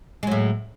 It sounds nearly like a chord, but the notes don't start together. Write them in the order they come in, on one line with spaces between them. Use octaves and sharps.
G#3 F#3 A2